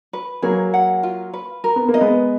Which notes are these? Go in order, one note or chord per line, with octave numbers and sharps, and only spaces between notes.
B4
F#3 A#3 G#4
F#5
F4
B4
A#4
B3
A#3
D#5
G#3 B3